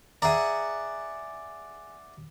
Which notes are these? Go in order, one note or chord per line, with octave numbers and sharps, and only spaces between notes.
G#4 D5 E5 F#5 A#5